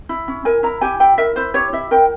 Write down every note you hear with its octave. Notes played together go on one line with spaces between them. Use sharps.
E4
C#4
A#4 G#5
E4 A#5
G4 G#5
E4 G5
A#4 E5
E4 C5
G4 C#5
E4 E5
A#4 G5